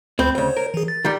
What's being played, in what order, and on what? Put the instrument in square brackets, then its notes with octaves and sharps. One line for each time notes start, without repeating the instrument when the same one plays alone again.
[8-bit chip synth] D2 B5 G6 [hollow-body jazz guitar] C4
[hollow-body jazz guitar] D2 C#3 [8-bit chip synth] C5 C#5
[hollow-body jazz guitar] A#4
[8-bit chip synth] E3 G#4
A6
[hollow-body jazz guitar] D#3 G3